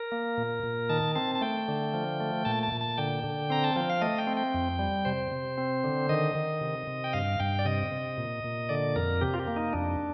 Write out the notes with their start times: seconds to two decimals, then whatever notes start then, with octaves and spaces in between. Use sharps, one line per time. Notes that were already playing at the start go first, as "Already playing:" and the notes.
Already playing: A#4
0.12 A#3
0.37 A#2
0.63 A#2
0.89 D#3 A5
1.15 C4 A5
1.35 A5
1.41 A3 G5
1.68 D3
1.94 F3
2.20 A3
2.45 A#2 A5
2.63 A5
2.72 A#2
2.81 A5
2.98 D3 G5
3.24 D3
3.50 C4 A#5
3.64 A5
3.76 F3 G5
3.90 F5
4.01 A3 D#5
4.18 G5
4.27 C4
4.37 G5
4.54 F2
4.79 G3
5.05 C3 C5
5.32 C3
5.58 C4
5.84 D3
6.09 D#3 D#5
6.35 D#3
6.61 C3
6.87 C3
7.04 G5
7.13 G2 F5
7.40 G2 G5
7.59 D5
7.65 C3 D#5
7.91 C3
8.17 A#2
8.44 A#2
8.69 D3 D5
8.96 F2 A#4
9.21 C3 G4
9.34 F4
9.39 G4
9.47 A#3
9.56 D#4
9.73 F2 D4